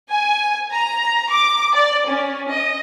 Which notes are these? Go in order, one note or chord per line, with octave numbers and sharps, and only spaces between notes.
G#5
A#5
D6
D5
C#4
D#5